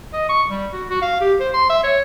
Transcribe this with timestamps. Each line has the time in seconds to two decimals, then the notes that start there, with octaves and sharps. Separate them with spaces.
0.13 D#5
0.29 C#6
0.50 G3
0.73 F#4
0.89 F#4
1.02 F5
1.21 G4
1.40 C5
1.54 C6
1.70 E5
1.84 C#5